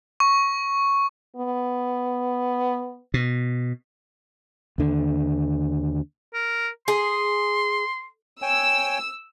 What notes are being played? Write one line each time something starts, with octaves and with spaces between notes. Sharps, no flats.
C#6
B3
B2
D#2 D3
A#4
G#4 C6
C#5 G5 G#5 E6